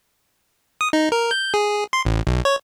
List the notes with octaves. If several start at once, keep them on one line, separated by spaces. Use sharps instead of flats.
D#6
D#4
A#4
G6
G#4
C6
A1
B1
C#5